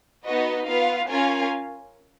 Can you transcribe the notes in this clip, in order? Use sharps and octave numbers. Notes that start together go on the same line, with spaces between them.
B3 D#4 F#4 B4 D#5
B3 F4 B4 F5
C#4 F4 A#4 F5 G#5